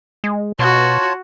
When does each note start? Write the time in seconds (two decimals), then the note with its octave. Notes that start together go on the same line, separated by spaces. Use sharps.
0.24 G#3
0.59 B2 F4 F#4 C#5 A5